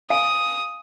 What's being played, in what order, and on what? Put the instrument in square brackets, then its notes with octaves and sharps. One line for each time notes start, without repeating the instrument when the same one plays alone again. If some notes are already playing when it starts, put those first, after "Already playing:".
[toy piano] F5 G#5 [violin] D#6